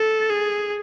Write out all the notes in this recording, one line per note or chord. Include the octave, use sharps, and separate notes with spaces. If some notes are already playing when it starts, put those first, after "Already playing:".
Already playing: A4
G#4